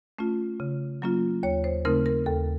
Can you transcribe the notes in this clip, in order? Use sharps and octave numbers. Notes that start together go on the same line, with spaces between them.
A3 C#4 F4
C#3
F#3 A#3 C#4 F4
D#2 C#5
C5
C#3 A3 C4 D#4 A#4
A#4
D#2 A4